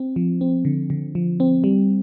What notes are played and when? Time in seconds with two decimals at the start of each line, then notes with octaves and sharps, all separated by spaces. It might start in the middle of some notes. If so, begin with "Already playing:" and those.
Already playing: C4
0.16 F3
0.41 C4
0.65 D3
0.90 D3
1.15 F3
1.40 C4
1.64 G3